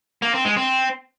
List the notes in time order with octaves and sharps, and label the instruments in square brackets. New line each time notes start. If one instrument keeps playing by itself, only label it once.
[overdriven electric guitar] A#3
C4
G#3
C4